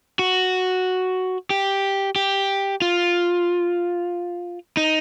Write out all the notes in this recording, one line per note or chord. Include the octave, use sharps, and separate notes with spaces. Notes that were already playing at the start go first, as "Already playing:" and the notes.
F#4
G4
G4
F4
D#4